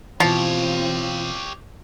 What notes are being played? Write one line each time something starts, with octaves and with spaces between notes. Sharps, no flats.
B2 E3 F3 C4 F4 G4 C#5